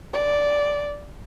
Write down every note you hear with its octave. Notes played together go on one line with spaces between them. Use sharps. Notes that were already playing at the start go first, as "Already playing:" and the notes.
D5